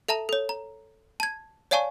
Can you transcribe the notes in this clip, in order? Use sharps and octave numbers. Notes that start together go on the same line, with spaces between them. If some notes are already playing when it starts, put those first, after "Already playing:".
A4 E5 A5 A#5
A4 C#5
A#5
A5 G#6
C#5 D5 F5 G#5 A5 C#6